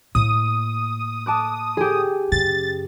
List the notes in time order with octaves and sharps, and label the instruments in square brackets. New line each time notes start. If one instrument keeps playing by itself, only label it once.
[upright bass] A2 A#3 [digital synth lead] D#6
[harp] A5 D6 F#6
G4 G#4
[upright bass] F#2 C#3 [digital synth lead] A6